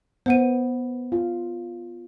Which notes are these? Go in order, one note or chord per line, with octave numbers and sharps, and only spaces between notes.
B3 C5 F#5 D#7
F4